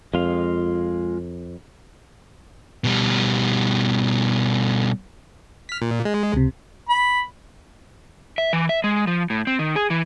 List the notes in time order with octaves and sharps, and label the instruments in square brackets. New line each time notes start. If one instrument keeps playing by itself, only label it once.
[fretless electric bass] F2 [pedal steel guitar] G#3 F4 F5
[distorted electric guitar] B2 G3
[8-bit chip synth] F6 B6
A#2
G#3
[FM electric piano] C#2 C3
[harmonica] B5
[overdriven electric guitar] E5
E3
E5
G#3
F3
A2
C4
D#3
G#4
E3